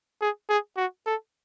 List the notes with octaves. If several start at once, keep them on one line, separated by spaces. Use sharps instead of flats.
G#4
G#4
F#4
A4